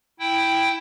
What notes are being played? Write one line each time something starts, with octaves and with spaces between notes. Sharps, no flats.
E4 G5